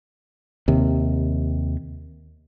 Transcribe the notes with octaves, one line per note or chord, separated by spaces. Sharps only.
D#2 C3